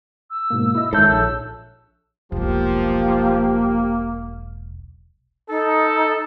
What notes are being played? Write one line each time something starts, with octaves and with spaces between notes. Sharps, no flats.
E6
G#2 B2 A#3
E4 D#5
G#2 D#3 A4 C#5 E5 A5 F#6 G6
A#1 E6
E1 B1 F3 A#3 G4
D#4 A4